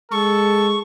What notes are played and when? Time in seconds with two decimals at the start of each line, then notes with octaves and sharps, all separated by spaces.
0.12 G#3 A4 C#6